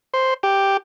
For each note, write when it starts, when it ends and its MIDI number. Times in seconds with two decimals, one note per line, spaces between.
0.14 0.34 72
0.43 0.77 67